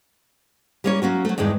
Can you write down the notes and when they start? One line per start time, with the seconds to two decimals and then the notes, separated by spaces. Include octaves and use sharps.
0.84 G3 A#3 C#4 A#4 C#5
1.02 F#3 A#3 C#4 F#4
1.25 F#3 A3
1.38 E2 G2 D#3 G#3